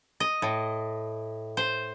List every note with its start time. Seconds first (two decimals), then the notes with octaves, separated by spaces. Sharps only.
0.20 D#5
0.42 A2
1.57 C5